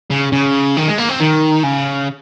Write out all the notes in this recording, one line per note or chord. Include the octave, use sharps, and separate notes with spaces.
C#3
C#3
D#3
G#3
A#3
C4
D#3
C#3